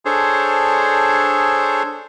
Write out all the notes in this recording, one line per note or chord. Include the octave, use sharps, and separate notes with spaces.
D4 G#4 A4 C5 C#5